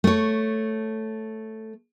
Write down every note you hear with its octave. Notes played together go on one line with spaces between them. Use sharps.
A3 C#5